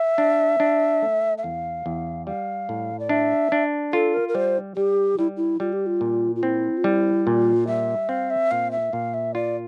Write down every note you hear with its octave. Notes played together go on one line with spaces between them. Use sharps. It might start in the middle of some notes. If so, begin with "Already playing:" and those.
Already playing: E5
D4
D4
A3
E5
E2 F5
E2
G3 F5
A2
D5
D4 E5
D4
F4 A4
A#4
A#4
G3 C5
G3 G4
G3 E4
E4
G3 F4
G4
F4
A#2
F4
C4 E4
F4
G3 E4
A#2 F4
G3 E5
C4 F5
E5
A#2 F5
E5
A#2 F5
E5
F4 D5